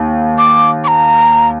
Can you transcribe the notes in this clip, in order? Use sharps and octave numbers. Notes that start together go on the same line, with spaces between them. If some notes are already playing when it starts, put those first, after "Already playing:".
Already playing: D#2
D6
D6
A#5